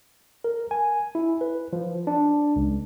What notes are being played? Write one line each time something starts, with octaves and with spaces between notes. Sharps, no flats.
A#4
G#5
E4
B4
F3
D4
C#2